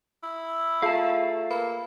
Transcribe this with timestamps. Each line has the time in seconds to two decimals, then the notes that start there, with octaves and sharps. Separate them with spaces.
0.23 E4
0.82 A3 F4 G#4 F5 A5
1.51 A#3 B4 B5